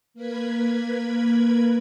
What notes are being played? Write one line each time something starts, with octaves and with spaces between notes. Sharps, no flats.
A#3 A#4 B4 B5 G#6